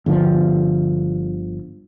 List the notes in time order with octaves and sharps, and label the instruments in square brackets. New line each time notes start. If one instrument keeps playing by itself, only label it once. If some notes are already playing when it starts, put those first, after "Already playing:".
[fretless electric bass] G1 D3 F3